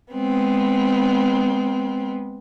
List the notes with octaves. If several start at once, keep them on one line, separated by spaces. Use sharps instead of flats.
G#3 B3 C4